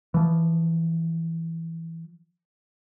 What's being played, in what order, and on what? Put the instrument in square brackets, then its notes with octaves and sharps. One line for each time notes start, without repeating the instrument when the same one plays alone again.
[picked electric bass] E3 F3